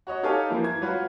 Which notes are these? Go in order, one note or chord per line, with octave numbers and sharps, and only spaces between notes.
F#4 C#5 D#5
D#4 G4 A4 C#5 F5 G#5
E3 F3 A#3 E4
G#6
F#3 F4 F#4 B4